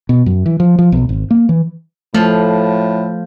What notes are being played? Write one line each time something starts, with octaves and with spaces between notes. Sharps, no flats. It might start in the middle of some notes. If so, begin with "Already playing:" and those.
B2
F#2
E3
F3
F3
B1
G#1
A#3
E3
A2 F3 A3